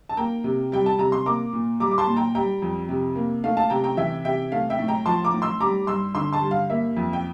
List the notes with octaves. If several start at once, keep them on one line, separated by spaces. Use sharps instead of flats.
A5
A#3 G5 A#5
C3
G3 G5
A5
C3 A#5
C6
A#3 A#5 D6
A#2
G3 A#5 D6
D6
A5 C6
A#2
G5 A#5
G3 G5 A#5
F2
C3
A#3
A3 F5
F5 A5
C3 G5 A#5
G5 A#5
E3 E5 G5
C3 E5 G5
A3 F5
E5 G5
A2
G5 A#5
F3 A5 C6
A#5 D6
A2
C6 E6
G3 A#5 D6
G2 C6 E6
D3 C6 E6
A5 C6
G2
F5
A#3 E5
F2
G5